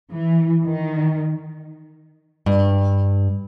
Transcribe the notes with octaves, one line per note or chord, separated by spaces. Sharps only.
E3
D#3
G2